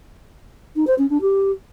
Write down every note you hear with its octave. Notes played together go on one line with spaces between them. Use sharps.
D#4
C5
C#4
D4
G4